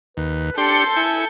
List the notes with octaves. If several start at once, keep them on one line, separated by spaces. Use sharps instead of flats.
D#2 B4
D4 G4 A4 C6 G6 C#7
E4 G#5